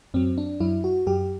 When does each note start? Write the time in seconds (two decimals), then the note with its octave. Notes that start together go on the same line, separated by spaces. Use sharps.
0.14 F#2 F#3 C4
0.38 D4
0.60 F#2 F#3 E4
0.84 F#4
1.07 F#2 F#3 G4